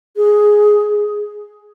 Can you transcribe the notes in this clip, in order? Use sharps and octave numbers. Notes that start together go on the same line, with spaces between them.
G#4